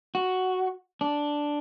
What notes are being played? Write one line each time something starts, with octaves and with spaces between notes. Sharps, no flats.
F#4
D4